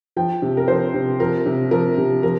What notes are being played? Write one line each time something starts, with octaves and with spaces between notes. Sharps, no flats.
F3 G5
C3
A#4
F3 C5
C3
F3 A#4
C3
F3 A#4
C3
F3 A#4